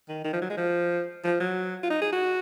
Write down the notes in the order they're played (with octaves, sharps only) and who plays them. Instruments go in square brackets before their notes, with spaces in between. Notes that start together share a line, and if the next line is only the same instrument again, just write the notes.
[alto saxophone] D#3
D#3
F3
F#3
G#3
F3
F3
F#3
F4
D#4
G#4
F#4